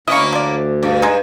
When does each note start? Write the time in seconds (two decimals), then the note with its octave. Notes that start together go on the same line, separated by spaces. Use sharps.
0.08 D2 A#3 C#4 E4 D#5 C#6
0.32 F3 D5
0.83 G2 D5
1.02 G#3 D#4